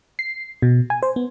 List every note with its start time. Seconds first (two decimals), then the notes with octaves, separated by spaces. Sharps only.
0.19 C7
0.62 B2
0.90 G#5
1.03 C5
1.16 B3